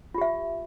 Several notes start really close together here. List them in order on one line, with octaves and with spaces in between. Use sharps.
F4 G4 E5